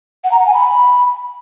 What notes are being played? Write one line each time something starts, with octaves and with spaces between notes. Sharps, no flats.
F#5
A#5
F#5
G#5
B5